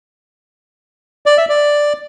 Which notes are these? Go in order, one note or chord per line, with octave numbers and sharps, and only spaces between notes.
D5
E5
D5